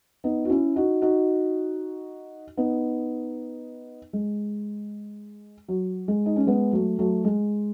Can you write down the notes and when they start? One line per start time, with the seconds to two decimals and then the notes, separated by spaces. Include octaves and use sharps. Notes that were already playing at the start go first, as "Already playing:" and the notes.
0.24 B3 D#4
0.45 F#4
0.50 C#4 E4
0.76 D#4 F#4
1.02 D#4 F#4
2.57 B3 D#4
4.13 G#3
5.68 F#3
6.08 G#3
6.26 D#4
6.36 C#4
6.47 G#3 B3
6.73 F#3 A3
6.99 F#3 A3
7.25 G#3